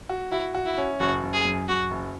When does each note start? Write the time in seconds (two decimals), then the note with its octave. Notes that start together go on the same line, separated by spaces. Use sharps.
0.09 F#4
0.31 E4 F#4
0.55 F#4
0.65 E4
0.78 C#4
1.00 F#1 F#4
1.23 F#1
1.34 G#4
1.45 F#2
1.68 F#2 F#4
1.91 F#1